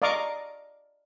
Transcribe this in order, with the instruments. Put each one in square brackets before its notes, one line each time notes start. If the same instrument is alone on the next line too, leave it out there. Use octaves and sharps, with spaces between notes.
[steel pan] D5 D#5 F5 A#5 C#6 D6